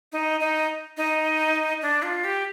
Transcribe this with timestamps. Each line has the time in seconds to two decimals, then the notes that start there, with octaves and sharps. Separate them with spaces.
0.12 D#4
0.40 D#4
0.97 D#4
1.82 D4
2.03 F4
2.24 G4